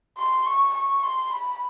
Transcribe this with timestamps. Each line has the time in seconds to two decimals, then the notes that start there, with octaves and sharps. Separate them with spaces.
0.18 C6
0.46 C#6
0.74 C#6
1.03 C6
1.31 B5